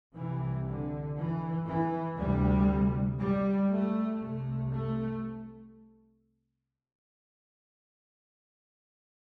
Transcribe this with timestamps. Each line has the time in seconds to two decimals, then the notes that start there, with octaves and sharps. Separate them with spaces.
0.17 C2 C3 E3
0.67 D3
1.18 E3
1.68 E3
2.18 D2 C3 G3
3.20 G3
3.71 A3
4.21 C2 C3 A3
4.72 A3